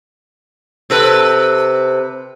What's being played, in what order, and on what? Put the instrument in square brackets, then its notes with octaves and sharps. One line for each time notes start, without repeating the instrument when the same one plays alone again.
[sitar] C3 A4 B4